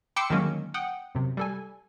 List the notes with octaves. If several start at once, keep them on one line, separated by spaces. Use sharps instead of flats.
G5 B5 C6 D6 E6 C#7
D3 D#3 F#3 G#3 A#3 C#4
F#5 G5 D#6
F#2 C3
G3 A4 G#5